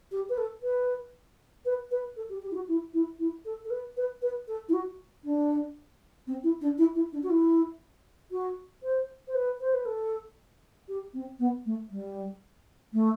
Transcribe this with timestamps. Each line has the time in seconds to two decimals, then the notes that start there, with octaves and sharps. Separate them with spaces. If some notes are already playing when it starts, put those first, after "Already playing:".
0.12 G4
0.29 B4
0.38 A4
0.63 B4
1.65 B4
1.91 B4
2.16 A4
2.29 G4
2.42 G4
2.51 E4
2.55 F#4
2.68 E4
2.94 E4
3.19 E4
3.45 A4
3.64 A4
3.70 B4
3.97 B4
4.22 B4
4.48 A4
4.69 E4
4.73 F#4
5.24 D4
6.27 C4
6.44 E4
6.61 D4
6.78 E4
6.95 E4
7.13 D4
7.23 F#4
7.30 E4
8.31 F#4
8.83 C5
9.28 C5
9.35 B4
9.61 C5
9.74 B4
9.85 A4
10.88 G4
11.14 C4
11.39 B3
11.66 A3
11.91 G3
12.93 A3